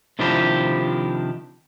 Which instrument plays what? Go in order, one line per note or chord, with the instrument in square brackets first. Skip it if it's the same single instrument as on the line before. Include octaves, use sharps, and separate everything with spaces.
[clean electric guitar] C3 D#3 F3 D4 E4 G4